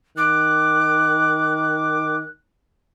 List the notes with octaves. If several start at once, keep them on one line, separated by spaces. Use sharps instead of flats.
D#3 D6 F#6